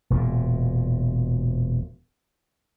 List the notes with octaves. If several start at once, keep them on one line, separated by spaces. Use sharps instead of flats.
E1 A#2